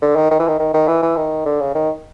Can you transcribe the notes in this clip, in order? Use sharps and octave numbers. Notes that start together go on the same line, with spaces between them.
D3
D#3
D#3
E3
D#3
D#3
D#3
E3
E3
D#3
D3
C#3
D#3